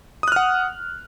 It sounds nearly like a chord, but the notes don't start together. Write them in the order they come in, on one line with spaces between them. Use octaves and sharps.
D#6 F#6 F6 F#5